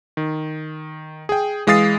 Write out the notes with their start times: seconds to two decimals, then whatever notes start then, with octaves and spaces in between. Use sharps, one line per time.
0.17 D#3
1.29 G#4 G5
1.67 E3 G#3 F5 D#6 A6 C7